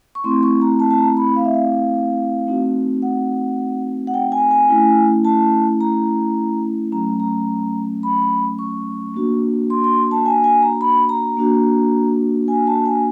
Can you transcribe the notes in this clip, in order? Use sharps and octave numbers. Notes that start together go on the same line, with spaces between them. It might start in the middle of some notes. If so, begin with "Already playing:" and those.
C#6
A3 C4 E4 C6
C#6
A#5
A5
A5
A#5
B5
F5
E5
F5
A3 C4 D#4 F#4
F#5
F#5
G5
G#5
G#5
A3 C#4 E4
A5
A#5
F#3 A3 C#4 A#5
A#5
B5
C#6
A#3 D4 F#4
C6
C6
A5
G#5
G#5
A#5
B5
A#5
A#3 D4 F#4
G#5
A5
G#5